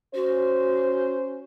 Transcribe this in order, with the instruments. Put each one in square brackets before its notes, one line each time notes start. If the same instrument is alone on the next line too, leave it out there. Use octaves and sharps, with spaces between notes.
[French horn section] C#4 C5 [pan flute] F#4